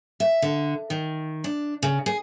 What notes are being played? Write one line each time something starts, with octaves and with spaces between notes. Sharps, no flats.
E5
D3
D#3
D4
C#3
G#4